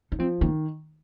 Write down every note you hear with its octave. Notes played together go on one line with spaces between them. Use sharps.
D#4
F3 C4
D#3 A#3